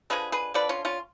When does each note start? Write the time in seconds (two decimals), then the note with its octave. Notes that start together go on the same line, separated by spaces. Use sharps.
0.10 D3 F3 G#3 G#4 B4
0.32 G#4 B4
0.54 D3 F3 B4 D5
0.69 C#4 F4
0.85 C#4 F4